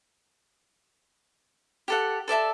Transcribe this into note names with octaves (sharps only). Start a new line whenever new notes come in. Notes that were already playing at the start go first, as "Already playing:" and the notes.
G4 A4 F#5
A4 D5 E5 A5